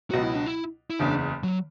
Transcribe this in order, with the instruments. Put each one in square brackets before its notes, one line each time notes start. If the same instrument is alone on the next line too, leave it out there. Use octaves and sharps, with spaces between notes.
[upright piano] C#2 B2 F#3 [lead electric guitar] F#4
[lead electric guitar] E4
D4
E4
E4
[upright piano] F#1 E2 C#3 [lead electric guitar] D4
[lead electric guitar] F#3